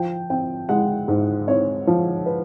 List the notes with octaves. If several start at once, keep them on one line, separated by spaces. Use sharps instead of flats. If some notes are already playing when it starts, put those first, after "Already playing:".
Already playing: F3 G5
C4 G5
G#3 F#5
G#2
C4 C#5
F3
B4